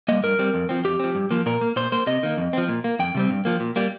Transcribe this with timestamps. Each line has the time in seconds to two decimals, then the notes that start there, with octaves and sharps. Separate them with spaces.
0.08 G3 A#3 D#5
0.23 G2 A#4
0.39 G3 C4
0.54 F2
0.69 F3 C4
0.85 F2 G4
1.00 F3 C4
1.15 G2
1.31 F3 A#3
1.46 A#2 A#4
1.61 A#3
1.76 A#2 C5
1.92 A#3 C5
2.07 C3 D#5
2.23 D#3 A#3
2.37 F2
2.53 F3 C4
2.69 A#2
2.84 A#3
2.99 F2 G5
3.15 C3 G3 C4
3.30 G2
3.45 F3 A#3
3.60 A#2
3.76 G3 A#3